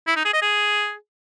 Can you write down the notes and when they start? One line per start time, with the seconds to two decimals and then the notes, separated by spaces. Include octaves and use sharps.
0.07 E4
0.16 D#4
0.25 G#4
0.33 D#5
0.42 G#4